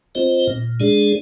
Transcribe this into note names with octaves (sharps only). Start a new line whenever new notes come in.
C4 F4 C5 D#5
A#2
G#3 D4 G#4 D5